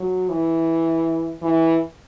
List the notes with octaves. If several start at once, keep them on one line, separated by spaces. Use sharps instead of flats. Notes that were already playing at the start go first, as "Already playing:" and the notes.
Already playing: F#3
E3
E3